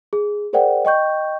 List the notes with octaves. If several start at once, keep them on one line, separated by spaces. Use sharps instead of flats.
G#4
G#4 A#4 C5 D5 F#5 G5
D#5 G5 C#6 G6